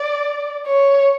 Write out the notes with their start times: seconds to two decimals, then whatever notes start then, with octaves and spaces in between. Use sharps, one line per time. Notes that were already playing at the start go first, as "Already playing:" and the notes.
Already playing: D5
0.66 C#5